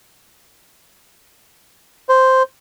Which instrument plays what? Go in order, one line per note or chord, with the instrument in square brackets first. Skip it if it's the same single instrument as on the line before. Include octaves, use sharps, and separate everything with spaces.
[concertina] C5